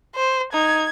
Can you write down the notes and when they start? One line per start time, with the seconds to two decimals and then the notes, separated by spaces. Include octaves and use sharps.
0.15 C5
0.53 D#4 G#6